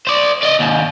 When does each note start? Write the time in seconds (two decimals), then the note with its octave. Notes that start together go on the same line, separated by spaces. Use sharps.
0.07 C5 D5
0.43 D5 D#5
0.59 D#2 G#2